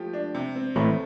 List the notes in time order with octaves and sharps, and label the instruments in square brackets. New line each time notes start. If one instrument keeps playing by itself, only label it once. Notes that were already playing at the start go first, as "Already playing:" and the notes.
Already playing: [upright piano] F3 A3 G4
D4
C3
C4
[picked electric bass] A1 A2 [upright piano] A3